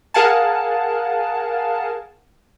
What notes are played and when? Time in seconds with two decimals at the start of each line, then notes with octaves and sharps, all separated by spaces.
0.14 G#4 A#4 F5 F#5 G#5 A5